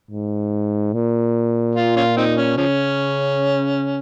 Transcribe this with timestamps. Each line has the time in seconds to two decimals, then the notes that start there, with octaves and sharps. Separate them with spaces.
0.11 G#2
0.93 A#2
1.75 F4
1.96 C#4 F4
2.17 C4 D#4
2.37 C#4
2.57 C#3 F3 C#4